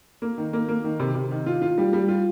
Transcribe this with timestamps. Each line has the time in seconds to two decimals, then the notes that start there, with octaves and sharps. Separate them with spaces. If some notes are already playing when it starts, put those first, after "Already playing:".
0.22 A#3
0.37 D#3
0.53 A#3
0.69 A#3
0.84 D#3
1.00 C3
1.15 C3
1.31 D#3
1.46 F4
1.62 F4
1.78 G3
1.93 G3
2.08 F4